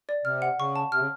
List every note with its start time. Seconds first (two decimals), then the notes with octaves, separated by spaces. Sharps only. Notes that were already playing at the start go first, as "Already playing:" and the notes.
0.09 D5
0.25 C3 F6
0.42 F#5
0.60 C#3 C#6
0.76 A5
0.92 C3 F6
1.00 C#3